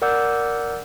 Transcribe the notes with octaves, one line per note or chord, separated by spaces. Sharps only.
A#4 D5 F#5 D6 E6 G6